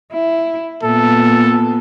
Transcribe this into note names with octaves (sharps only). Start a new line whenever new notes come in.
E4
A#2 B3 A4